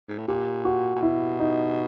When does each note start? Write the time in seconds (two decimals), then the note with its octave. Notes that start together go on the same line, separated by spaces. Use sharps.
0.09 G#2
0.18 A2
0.28 A#2 G4
0.65 F#4
0.96 A#2
1.02 B2 E4
1.40 D#4